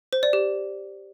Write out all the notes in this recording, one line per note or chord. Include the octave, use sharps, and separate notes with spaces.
C5
D5
G4